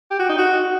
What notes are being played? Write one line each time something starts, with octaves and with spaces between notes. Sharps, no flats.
G4
F#4
D#4
F#4